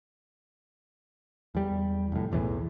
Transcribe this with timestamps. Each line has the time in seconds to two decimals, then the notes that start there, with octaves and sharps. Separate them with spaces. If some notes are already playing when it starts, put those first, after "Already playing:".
1.55 E2 G3
2.12 F1 A2
2.32 B1 E2 A2 E3